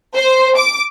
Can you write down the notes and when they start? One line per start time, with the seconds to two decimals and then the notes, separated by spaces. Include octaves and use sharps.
0.16 C5
0.57 D6